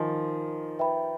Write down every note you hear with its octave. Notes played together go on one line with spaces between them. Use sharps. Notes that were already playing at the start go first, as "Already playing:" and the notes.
Already playing: D#3 F3 A#4 D#5 G#5 C6
B4 E5 G5 B5